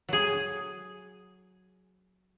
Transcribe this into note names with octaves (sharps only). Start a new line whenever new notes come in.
F#3 G#4